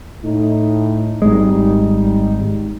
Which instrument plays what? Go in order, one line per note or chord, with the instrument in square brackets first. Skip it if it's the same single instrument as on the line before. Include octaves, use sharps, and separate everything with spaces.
[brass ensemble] A2 D#4
[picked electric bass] G#1 G#3 [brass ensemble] G3 D#4